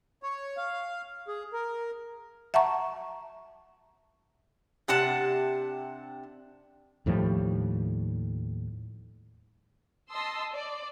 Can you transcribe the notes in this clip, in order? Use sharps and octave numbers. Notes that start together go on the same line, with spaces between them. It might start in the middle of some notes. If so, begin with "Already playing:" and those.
C#5
F5
G#4
A#4
E5 F#5 A5 A#5 C#6
C3 D4 F#5 A5
D#2 A2 F3 G3
D#5 A5 C6 D#6 E6
D5